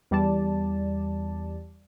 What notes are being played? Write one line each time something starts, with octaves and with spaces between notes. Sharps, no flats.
E2 G3 D5 A5